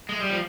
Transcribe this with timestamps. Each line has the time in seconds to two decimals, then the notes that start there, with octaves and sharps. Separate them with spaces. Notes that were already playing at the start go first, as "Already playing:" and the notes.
0.09 G#3
0.20 G3
0.30 F3